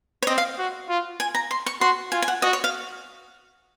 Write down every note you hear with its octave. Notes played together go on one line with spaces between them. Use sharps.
C#5
C4 D#5
F5
F#4
F4
G#5
A#5
C6
C#6
F#4 C6
F4 G#5
G#5
F#5
F#4 D#5
C#5
F5